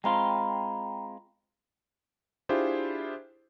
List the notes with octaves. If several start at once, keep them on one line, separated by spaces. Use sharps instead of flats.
G#3 C4 F4 G5 A#5 B5
D4 E4 F4 G4 G#4 C5